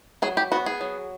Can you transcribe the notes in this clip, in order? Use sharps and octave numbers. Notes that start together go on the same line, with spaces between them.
F#3 G#4
G4
B3 F#4
G#4
F#3